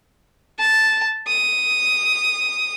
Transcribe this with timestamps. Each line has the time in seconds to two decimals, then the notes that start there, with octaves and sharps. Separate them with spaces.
0.59 A5
1.28 D#6